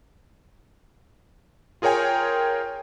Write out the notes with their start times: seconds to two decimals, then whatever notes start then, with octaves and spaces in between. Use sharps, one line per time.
1.82 F4 G#4 A#4 C#5 G5 G#5